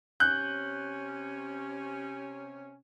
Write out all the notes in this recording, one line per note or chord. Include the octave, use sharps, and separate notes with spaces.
C3 C#4 F#6 G6